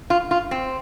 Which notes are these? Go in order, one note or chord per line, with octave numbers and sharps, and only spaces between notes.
F4
F4
C4